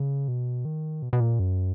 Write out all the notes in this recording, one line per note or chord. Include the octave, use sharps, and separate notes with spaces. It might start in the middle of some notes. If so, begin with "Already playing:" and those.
Already playing: C#3
B2
D#3
B2
B2
A#2
F#2